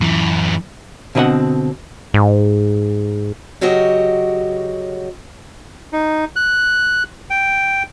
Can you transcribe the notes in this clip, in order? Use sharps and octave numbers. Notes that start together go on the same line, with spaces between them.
F#2 E3
B2 D3 C4 B4 D#5 F#5
G#2
C#3 F#3 F#4 G4 D#5
D#4
F#6
G5